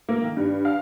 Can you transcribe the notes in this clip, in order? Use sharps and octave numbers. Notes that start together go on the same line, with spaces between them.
A#3
D#3
G2
F5